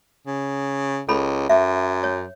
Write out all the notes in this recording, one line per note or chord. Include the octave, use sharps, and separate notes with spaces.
C#3
C#2 A4 B5
F#2 E5
C#5